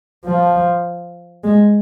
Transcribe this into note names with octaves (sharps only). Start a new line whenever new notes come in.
F3
G#3